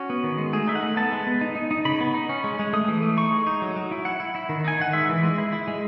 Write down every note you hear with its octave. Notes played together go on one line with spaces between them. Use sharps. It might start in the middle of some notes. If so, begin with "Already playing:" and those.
Already playing: C#4 F#4
B3
D#3
G#3
A3 G#4
D#4 E5
F#5
A3
B3 A5
G#3
B3
D#4
D#4
D#4
C#3 B5
B3
D#4
C#4
G#3
G#3
A3 D#6
E3
A3
D#4 C#6
G#3
D#4
F#3
F#3
E4
E4 F#5
E4
E4
D#3
D#4 G#5
D#3 F#5
G#3 E5
E3
G#3
E4
E4
G#3